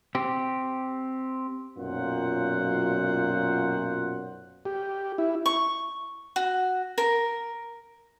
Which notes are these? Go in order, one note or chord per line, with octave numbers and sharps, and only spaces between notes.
C4 G4
B1 F#2 A#2 F4 C5 F#5
G4
E4
C#6
F#4
A#4